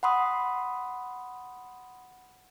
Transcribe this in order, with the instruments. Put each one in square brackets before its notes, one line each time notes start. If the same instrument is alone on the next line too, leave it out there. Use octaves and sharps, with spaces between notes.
[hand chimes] F#5 B5 C6 D#6